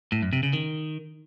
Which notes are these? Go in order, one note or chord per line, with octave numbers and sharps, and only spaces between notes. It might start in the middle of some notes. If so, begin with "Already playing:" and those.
A2
F#2
C3
C#3
D#3